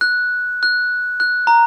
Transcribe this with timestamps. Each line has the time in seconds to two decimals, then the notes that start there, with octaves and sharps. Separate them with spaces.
0.01 F#6
0.63 F#6
1.20 F#6
1.47 A#5